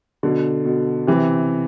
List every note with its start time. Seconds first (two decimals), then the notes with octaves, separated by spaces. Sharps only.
0.23 B2 D3
0.65 B2
1.07 C3 E3